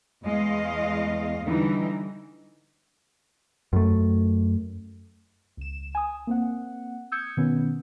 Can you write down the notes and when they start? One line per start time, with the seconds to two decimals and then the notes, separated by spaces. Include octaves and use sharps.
0.23 E2 G#3 D#5 F5
1.43 D3 E3 G3 D#4
3.73 F#2 A3
5.57 C#2 E7
5.95 G#5 D#6
6.27 A#3 C4 F#5
7.12 D#6 E6 G6 G#6 C#7
7.37 B2 D#3 B3 C#4